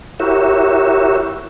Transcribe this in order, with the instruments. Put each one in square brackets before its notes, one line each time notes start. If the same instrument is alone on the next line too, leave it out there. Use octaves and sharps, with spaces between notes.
[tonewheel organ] E4 F#4 G4 A#4 C#5 E5